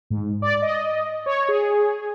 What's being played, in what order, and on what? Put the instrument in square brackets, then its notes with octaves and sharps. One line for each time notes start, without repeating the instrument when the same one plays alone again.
[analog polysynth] G#2
D5
D#5
C#5
G#4